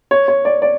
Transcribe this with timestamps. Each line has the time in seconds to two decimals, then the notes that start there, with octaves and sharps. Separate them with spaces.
0.11 C#5
0.28 C#5
0.45 D5
0.62 D5